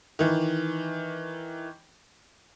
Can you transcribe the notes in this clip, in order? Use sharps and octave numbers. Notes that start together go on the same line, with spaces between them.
D#3 E3